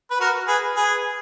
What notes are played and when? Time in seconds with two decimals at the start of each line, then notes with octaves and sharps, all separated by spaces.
0.11 B4
0.20 F#4 A#4
0.48 G#4 B4
0.76 G#4 B4